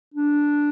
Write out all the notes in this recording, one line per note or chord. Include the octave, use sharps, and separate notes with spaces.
D4